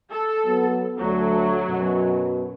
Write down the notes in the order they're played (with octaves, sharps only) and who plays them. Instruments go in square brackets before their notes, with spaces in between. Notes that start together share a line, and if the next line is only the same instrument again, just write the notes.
[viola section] A4
[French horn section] F#3 B3
[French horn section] D2 A3 [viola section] F#3
[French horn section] F#2 B2